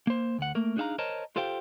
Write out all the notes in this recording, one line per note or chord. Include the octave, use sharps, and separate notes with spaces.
A#3 C5
D2 F#5
A3 A#3 A#4
D4 D#4 G#4 E5 F5 A#5
A#4 C5 C#5 D#5 A5 A#5
F4 G4 A4 C5 F5 G5